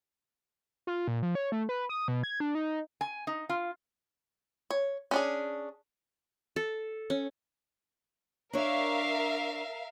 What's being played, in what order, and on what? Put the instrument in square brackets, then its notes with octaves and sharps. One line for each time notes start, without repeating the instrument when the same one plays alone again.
[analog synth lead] F4
A#2
F3
C#5
A3
B4
D#6
B2
G#6
D4
D#4
[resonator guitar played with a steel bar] G#5
D#4
F4
[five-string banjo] C#5
C#4 D4 G#4
[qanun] A4
C#4
[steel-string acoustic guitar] D4 C#5 [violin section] A#4 E5 F5